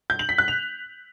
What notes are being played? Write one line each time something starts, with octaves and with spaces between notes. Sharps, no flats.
G6
F#7
B6
F#6
F7